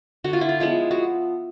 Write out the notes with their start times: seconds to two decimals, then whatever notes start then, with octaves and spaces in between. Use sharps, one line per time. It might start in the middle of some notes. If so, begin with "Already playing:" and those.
0.24 D3 F#4
0.33 F4
0.41 E4
0.49 F4
0.60 F3 G#3 B3 E4
0.91 F#4